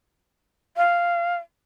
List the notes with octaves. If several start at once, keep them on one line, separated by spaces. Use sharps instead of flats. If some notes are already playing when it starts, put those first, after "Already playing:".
F5